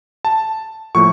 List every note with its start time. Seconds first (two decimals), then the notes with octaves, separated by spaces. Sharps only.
0.25 A5
0.95 A2 F3 A#3 C#6